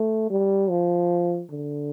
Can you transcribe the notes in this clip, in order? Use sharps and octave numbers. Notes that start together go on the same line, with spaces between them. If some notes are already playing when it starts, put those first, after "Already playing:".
Already playing: A3
G3
F3
D3